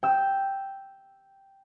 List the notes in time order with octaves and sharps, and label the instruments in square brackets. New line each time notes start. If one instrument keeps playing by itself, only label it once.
[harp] G5 E6